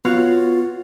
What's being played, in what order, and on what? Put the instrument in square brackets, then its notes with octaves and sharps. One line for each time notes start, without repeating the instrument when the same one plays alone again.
[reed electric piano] B3 [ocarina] F4 [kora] F#4 C#5 F5